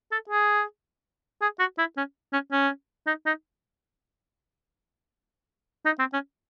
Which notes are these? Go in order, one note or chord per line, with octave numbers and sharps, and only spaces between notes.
A4
G#4
G#4
F#4
E4
C#4
C#4
C#4
D#4
D#4
D#4
C4
C#4